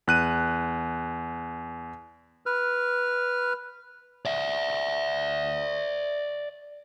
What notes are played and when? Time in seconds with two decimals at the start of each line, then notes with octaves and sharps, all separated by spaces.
0.08 E2 F#6 D#7
2.46 B4 F6
4.25 D5 E5